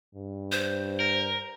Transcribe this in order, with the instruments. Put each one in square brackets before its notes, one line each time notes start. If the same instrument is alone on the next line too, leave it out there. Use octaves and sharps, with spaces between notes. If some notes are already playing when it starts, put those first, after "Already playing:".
[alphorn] G2
[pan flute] C5
[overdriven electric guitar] A#4